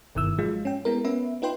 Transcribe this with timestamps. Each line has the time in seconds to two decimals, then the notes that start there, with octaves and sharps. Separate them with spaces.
0.15 G1 B2 D#3 E4 E6
0.38 G#2 F3 F#3 G#3 F4
0.65 C#4 G5
0.85 G#3 B3 E4 A#4
1.04 B3 C#4 B4 E5
1.42 D#4 F4 B4 G5 C6